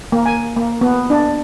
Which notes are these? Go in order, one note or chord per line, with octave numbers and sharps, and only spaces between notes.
A#3
G#5
A#3
B3
D4